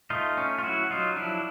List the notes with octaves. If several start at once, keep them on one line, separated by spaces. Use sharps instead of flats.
A3 D#4 F4
C#4
F4
F#3 E4 F#4
F#3 D#4 F4
F3 D4 E4